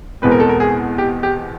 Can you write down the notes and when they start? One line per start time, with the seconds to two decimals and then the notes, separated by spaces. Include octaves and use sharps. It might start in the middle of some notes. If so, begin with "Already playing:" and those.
0.22 E2 B2 G#3 C4 B4
0.32 A#4
0.40 A4
0.49 A#4
0.60 G#4
0.98 G4
1.23 G4